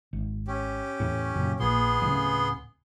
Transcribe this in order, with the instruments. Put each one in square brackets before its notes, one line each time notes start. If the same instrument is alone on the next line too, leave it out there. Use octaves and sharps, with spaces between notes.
[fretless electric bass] G#1
[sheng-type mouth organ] C#4 G4
[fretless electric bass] E2 A2
F#2 A#2 C#3
[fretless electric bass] A#1 A#2 [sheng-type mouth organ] B3 G#4 C6
[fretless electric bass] D1 A2 C#3